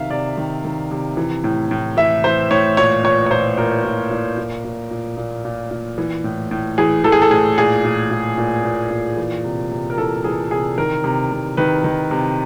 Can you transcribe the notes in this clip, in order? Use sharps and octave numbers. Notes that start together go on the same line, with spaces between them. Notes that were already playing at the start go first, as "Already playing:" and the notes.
Already playing: C3 D#3 E5 F5
C3 D5
D#3
D#3
C3
E3
A2
A2
E3 E5
E3 C5
A2 C#5
A#2 C#5
A#2 C#5
C#5
A#2 C5
A#2 A#4
A#2
A#2
A#2
A#2
A#2
A#2
A#2
A#2
E3
A2
A2
E3 G#4
E3 A4
G#4
A4
A2 G#4
A#2 G#4
A#2
A#2
A#2
A#2
A#2
E3
C3
C3
A#4
E3 A4
E3 G#4
C3 G#4
D#3 A#4
C3
C3
D#3 B4
D#3
C3